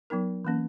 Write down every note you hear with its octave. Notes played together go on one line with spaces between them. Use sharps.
F#3 B3 D#4 A#4
E3 A#3 C#4